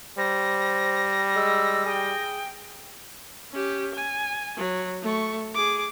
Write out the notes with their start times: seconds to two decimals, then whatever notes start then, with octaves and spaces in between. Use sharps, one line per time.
0.18 G3 C5 A#6
1.36 G#3 E6
1.86 G#4 G5
3.52 C#4 G4
3.94 G#5
4.57 F#3
5.02 A3 C#6
5.55 G#4 D6